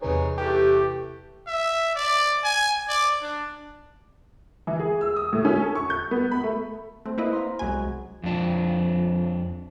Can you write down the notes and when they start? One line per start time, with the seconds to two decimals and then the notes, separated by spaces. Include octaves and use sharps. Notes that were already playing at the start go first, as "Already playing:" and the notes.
0.02 E2 C3 D#4 G#4 B4 C#5
0.38 E3 A3 G4
1.47 E5
1.95 D5
2.44 G#5
2.88 D5
3.22 D4
4.67 E3
4.79 G#4
5.01 E6
5.16 D#6
5.33 A2
5.45 C#4
5.61 A4
5.75 C#6
5.90 G6
6.11 B3
6.31 B5
6.43 A3
7.06 A3 C4
7.18 A#3 E4 B4 D#5
7.33 F5 A#5 C6
7.59 C2 F#2 F#3 G#3 G#5
8.23 F2 F3 D4